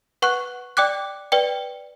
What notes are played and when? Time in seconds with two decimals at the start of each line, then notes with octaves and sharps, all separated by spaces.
0.22 B4 F#5 C#6 F#6
0.77 D5 G5 D6 F#6
1.32 B4 D5 G5